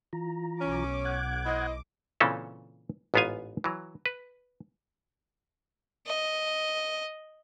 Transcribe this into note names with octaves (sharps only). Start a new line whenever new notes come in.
E3 F4 A#5
B1 C#4 D6
F#5 F#6 G#6
E4 C5 D#5
A#2 C#3 E3 C4 C#4 A4
A1 G#2 B3 F4 F5 G#5
E3 F#3
B4
D#5